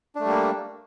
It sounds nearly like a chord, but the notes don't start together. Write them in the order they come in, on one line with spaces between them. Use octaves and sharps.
D4 A3 G3 A#3